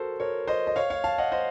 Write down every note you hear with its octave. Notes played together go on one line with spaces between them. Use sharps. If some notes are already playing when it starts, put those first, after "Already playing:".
Already playing: F#4 A4 A#4 C5
A#4 C#5
C5 D#5
D#5
C#5 F5
C#5 F5
F5 A5
D#5 F#5
C5 D#5